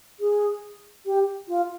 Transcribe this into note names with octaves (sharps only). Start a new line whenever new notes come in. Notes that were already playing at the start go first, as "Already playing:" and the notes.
G#4
G4
F4